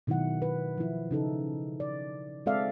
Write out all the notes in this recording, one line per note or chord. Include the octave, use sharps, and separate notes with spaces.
B2 D#3 F#3 E4 F#5
B4
F3 E4
C#3 D#4 A4
D5
G#3 C4 A4 D5 E5 F5